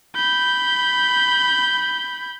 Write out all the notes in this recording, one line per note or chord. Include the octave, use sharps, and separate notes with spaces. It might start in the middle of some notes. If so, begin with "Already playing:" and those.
B5 G6